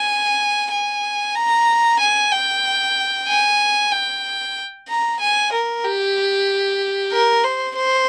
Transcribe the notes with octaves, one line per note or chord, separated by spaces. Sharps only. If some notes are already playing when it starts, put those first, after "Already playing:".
Already playing: G#5
G#5
A#5
G#5
G5
G#5
G5
A#5
G#5
A#4
G4
A#4
C5
C5